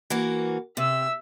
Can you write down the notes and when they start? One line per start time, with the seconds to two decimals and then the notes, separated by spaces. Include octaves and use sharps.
0.10 E3 A#3 F#4
0.77 C3 E5 E6